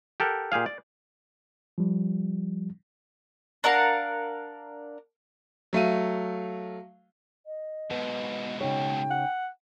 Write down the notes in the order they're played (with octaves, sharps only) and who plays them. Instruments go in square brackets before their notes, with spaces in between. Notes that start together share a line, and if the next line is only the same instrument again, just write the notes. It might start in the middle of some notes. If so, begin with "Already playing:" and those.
[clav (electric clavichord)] G4 A4 A#4 F#5
A#2 G4 G#4 F5
D5
[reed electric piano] F3 G3
[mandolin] D4 A#4 F5 F#5
[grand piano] F#3 A3 F5 D#7
[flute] D#5
[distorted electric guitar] G#2 B2 [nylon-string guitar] B3
[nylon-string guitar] C#3 D#4 C#5 [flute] G5
[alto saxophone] F#5